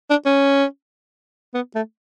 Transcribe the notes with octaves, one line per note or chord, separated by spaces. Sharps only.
D4
C#4
B3
A3